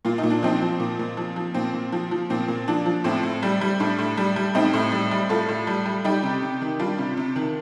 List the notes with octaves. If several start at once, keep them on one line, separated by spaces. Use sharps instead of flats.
A#2 F4
D#4
A#2
D4
F3 C4 D#4
F3
A#2
A#2
F3
F3
A#2 C4
A#2
F3
F3
A#2 C4
A#2
F3 D4
F3
A2 C4
A2
G3
G3
A2 D4
A2
G3
G3
A2 C4 D#4
A2
G3
G3
A2 F4 A4
A2
G3
G3
G3 D#4 G4
C3
C3
D#3
G3 D4 F4
C3
C3
D#3